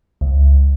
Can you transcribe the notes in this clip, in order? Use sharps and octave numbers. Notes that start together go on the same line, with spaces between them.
C#2